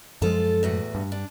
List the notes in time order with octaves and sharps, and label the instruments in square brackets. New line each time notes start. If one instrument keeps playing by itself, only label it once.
[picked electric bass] F#2 F3 G#3 [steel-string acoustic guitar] F4 A4 F5
[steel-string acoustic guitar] E2 A2 F#4
[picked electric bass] G2
[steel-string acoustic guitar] D4